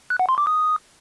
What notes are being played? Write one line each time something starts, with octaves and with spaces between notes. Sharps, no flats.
F#6
F#5
C6
D6
D#6